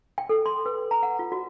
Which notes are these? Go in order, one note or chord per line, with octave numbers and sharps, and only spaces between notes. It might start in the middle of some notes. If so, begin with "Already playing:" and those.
G5
A4
C6
B4
A#5
F#5
F4
F#4